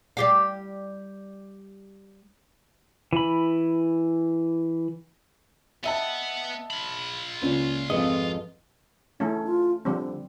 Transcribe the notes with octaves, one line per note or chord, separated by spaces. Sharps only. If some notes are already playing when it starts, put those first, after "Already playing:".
G3 G4 F5
E3 B5
B3 D#5 E5 F#5 G5 A5 E6
F4 B5
C#2 A#3 C#4 D5
G#1 F2 G#4 A4 B4 D#5
E3 A3 C#4 D#4
F4
D3 F3 G3 C4